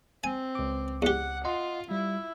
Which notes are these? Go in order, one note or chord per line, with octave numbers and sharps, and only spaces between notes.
C4 G#5
C#2 D6
E2 G4 F#5
F4 D#5 F#5 C6
G3 E4